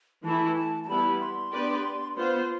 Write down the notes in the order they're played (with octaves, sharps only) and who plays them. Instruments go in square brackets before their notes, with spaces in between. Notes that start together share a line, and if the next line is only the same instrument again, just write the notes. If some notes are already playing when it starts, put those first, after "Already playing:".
[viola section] E3 A3 E4 [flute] A5
[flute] A5
A5
[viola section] G3 B3 E4 [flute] B5
[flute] C6
[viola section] B3 D4 G4 B4 D5
[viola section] B3 F4 C5 [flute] C6